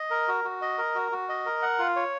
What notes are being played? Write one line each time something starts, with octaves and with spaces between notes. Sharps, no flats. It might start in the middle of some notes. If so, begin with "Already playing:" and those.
Already playing: D#5
A#4
F#4
F#4
D#5
A#4
F#4
F#4
D#5
A#4
F#5
F4
C#5